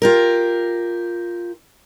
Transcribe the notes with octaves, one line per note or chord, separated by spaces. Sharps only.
F4 G4 A#4